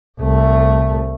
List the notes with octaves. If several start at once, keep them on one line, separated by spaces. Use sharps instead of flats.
C2 A3